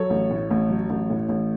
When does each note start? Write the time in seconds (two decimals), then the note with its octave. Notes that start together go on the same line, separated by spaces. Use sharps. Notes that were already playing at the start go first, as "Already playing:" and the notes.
Already playing: F#3 A4 C#5
0.10 A1
0.30 A2
0.50 A1
0.70 F#3
0.90 A1
1.10 A2
1.29 A1